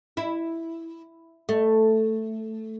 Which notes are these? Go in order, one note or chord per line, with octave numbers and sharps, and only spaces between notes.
E4
A3